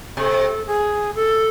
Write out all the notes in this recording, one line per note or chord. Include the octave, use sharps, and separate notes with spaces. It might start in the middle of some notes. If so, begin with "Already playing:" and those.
C3 A4
G#4
A4